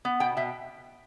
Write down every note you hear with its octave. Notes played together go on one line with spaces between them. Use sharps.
B3
B2 G5
B2 E5